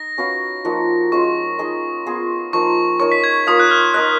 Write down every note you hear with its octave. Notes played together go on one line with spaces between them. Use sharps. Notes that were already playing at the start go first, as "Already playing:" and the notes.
Already playing: D#4 A#6
C#4 F#4 B4 F5
F3 A#3 D#4 F#4
G#3 C#4 F4 C#6
D#4 G#4 D#5
B3 F4 G#4
F3 A#3 D#4 C#6
D#4 A#4 C#5 C#6
B6
G#6
A#3 F4 A#4 F5 D#6
F#6
F6
D#4 A#4 D#5 F#6